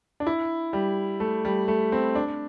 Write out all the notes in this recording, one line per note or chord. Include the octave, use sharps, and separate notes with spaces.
D4
E4
G3
A3
G3
A3
C4
D4